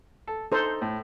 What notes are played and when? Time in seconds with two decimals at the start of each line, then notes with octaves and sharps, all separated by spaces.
0.27 A4
0.52 D#4 A4 C5
0.82 A2